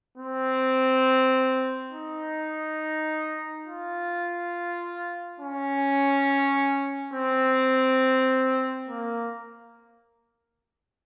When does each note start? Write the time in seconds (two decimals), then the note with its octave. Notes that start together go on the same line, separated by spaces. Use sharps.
0.18 C4
1.92 D#4
3.67 F4
5.40 C#4
7.14 C4
8.89 A#3